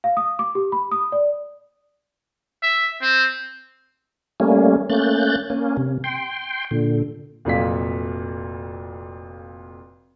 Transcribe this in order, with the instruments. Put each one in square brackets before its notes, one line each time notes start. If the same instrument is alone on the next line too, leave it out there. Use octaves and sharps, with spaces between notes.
[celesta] F5
D#6
D6
G4
B5
D#6
D5
[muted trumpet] E5
C4
[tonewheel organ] G3 A3 A#3 C#4
A3 A#3 C#4 F#6 G6 A6
A#3 C#4
C3
G5 C6
A#2 D3
[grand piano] F1 F2 A#2 F#3 F4 B6